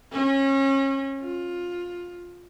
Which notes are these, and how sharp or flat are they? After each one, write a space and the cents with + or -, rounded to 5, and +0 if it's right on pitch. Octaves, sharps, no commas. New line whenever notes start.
C#4 -30
F4 +15